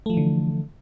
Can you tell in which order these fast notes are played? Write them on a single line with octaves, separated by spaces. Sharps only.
A3 F3 E3 D3